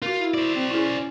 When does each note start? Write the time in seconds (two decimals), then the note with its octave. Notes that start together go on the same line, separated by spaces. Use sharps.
0.02 F4 F#4 A#4
0.17 E4
0.34 C5 D5
0.55 C4
0.71 C#4 E4 G#4